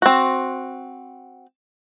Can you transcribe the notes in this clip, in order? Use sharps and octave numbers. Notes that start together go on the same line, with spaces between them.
C4 F#4